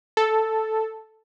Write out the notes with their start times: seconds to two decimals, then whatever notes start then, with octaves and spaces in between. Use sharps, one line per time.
0.17 A4